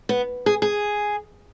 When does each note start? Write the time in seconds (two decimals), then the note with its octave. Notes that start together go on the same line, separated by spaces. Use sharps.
0.09 B3
0.46 G#4
0.62 G#4